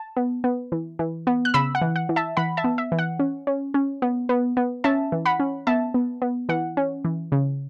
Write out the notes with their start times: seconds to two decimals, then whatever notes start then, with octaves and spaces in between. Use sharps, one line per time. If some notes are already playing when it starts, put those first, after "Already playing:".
Already playing: A5
0.16 B3
0.44 B3
0.72 E3
0.99 E3
1.27 B3
1.45 F#6
1.54 C#3 B5 E6
1.75 F#5
1.82 E3
1.96 F#5
2.09 E3
2.16 E5 A5
2.37 E3 F#5 B5
2.57 E5 A5
2.64 B3
2.78 E5
2.92 E3
2.99 F#5
3.19 C#4
3.47 C#4
3.74 C#4
4.02 B3
4.29 B3
4.57 B3
4.84 C#4 E5 A5
5.12 E3
5.26 F#5 B5
5.39 C#4
5.67 B3 E5 A5
5.94 B3
6.22 B3
6.49 E3 F#5
6.77 C#4
7.05 E3
7.32 C#3